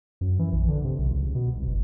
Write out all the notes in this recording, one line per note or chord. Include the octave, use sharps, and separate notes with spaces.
F#2
E3
A#1
D3
C3
B1
C#2
B2
C2
F#1